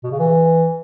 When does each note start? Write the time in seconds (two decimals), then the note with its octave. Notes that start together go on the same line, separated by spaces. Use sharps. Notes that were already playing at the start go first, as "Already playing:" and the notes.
0.04 B2
0.11 C#3
0.19 E3